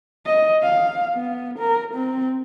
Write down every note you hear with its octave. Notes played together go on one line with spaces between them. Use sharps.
D#5
F5
B3
A#4
C4